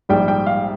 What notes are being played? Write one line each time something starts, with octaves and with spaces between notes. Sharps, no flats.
A#1 G#2 G3 G5
G5
F5